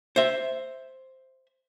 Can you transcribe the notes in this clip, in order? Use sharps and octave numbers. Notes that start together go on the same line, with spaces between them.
C5 E5